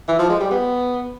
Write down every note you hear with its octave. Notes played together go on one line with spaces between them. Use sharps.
E3
F3
G#3
G3
B3